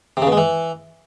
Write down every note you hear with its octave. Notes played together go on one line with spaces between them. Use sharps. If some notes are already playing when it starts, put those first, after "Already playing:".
C3
C#3
B2
G#3
E3